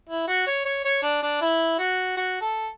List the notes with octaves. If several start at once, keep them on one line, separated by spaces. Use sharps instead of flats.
E4
F#4
C#5
C#5
C#5
D4
D4
E4
F#4
F#4
A4